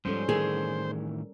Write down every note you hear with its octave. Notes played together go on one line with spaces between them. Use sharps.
G#2 F3 G3 C#4 A4 C5
A2 D#3 E3 G#4 A#4